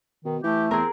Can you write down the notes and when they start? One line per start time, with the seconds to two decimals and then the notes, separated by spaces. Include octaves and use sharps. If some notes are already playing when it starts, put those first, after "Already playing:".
0.25 B2 D#3
0.43 E3 A3 G4
0.71 E2 C4 G#4 A#4